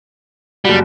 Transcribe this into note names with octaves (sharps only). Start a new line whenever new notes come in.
F#1 G3 F#4